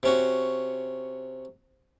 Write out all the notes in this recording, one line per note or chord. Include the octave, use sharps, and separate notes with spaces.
C3 C#4 F#4